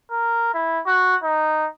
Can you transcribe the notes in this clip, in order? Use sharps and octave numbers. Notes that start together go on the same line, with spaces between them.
A#4
E4
F#4
D#4